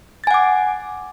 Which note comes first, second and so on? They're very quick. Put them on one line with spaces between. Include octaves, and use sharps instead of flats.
A6 G#5 F#5 D6